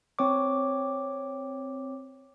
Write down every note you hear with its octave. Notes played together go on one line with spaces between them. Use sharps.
C4 C#5 D6